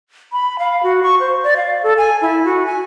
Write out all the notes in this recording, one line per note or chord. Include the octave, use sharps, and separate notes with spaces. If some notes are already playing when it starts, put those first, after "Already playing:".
B5
F5
F#4
C#6
C5
D5
F5
A4
G#5
E4
F#4
G#5